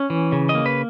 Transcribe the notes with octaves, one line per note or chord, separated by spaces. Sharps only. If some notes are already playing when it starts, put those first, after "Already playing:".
Already playing: C#4
E3
C#3
D#5
A#3
B4